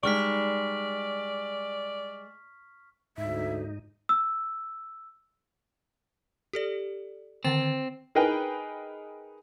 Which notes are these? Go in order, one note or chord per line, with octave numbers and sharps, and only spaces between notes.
G3 G#3 D#4 D5 C#6 F6 B6
D2 G#2 D#4 E5
E6
G4 A4 D5
D3 D#3 C4 A6
D#4 G#4 A#4 B4 G5